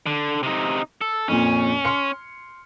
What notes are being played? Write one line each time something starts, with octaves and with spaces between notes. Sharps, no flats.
D3
C3 D#4
A4
F2 A#2 C#4
C6 F6 C#7